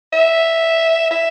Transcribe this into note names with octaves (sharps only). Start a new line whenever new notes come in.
E5
E5